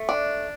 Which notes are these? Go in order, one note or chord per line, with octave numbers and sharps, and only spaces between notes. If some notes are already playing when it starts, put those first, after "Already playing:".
Already playing: A3
D4